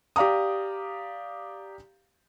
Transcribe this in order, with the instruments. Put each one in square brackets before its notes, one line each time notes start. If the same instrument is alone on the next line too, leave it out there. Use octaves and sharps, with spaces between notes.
[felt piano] G4 D5 F5 A#5 D#6